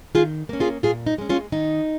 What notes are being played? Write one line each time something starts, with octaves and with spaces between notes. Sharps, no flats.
D#3 F4 G#4
A#3 C#4
F4 G#4
A#2 F4 G#4
D#4
G#3 C#4
C#4 F4
D#3 D#4